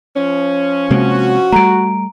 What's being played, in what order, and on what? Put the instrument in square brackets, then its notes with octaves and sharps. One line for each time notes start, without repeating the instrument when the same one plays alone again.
[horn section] F3 C#4
[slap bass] C3 G#3 A#3 [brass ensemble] F#4
[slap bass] G3 A3 [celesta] A#5 D7